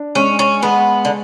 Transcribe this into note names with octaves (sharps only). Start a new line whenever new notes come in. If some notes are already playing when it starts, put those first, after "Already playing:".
Already playing: D4
G#3 C#4
C#4
G#3 B3
D3